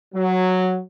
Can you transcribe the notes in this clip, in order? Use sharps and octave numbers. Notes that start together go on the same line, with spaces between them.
F#3